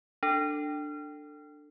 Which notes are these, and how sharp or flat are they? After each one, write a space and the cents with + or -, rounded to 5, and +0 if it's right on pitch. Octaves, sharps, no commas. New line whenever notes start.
D4 +10 A4 +20